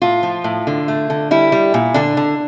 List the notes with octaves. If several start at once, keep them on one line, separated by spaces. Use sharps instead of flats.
A2 F4
F3
A2
D3
A3
D3
G3 E4
G3
A#2
D3 D4
D3